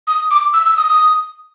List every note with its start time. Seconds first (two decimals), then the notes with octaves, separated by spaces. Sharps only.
0.07 D#6
0.31 D6
0.53 E6
0.66 E6
0.77 D#6
0.89 D#6